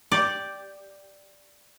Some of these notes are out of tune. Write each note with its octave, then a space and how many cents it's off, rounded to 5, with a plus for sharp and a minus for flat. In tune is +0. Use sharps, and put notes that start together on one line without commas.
G4 +0 D5 +0